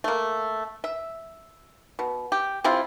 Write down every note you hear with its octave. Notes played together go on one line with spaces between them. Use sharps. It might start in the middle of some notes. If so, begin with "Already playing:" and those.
A3 A#3
E5
B2
G4
C3 C4 E4 F4